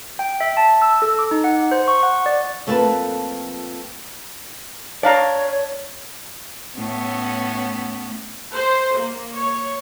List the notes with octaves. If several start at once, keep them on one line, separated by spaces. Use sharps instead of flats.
G5
E5
A5
E6
A4
D6
D#4
F#5
C5
C#6
F#5
D5
F2 A3 A#3 F4 B4 A5
D4 C#5 D5 F5 A#5
A2 B3 C#4
C5
A#3
C#5